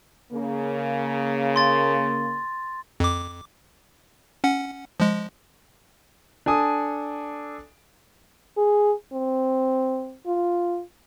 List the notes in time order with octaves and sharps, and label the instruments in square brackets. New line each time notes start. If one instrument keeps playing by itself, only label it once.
[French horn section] C#3 A#3
[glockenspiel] C6 A6
[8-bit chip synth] F2 D6
C#4 F#5
F3 G#3
[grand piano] D4 A4 G#5 D#6
[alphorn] G#4
C4
F4